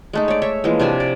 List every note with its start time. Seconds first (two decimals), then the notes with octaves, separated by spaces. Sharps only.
0.13 G#3 A3 D#4
0.28 C#5 D5
0.42 C#5 E5
0.64 E3 F3 G#3 A#3
0.80 C3 D4 G#5 A5
1.00 D5